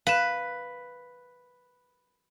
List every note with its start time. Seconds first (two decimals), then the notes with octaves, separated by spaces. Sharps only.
0.07 B4 F5 E7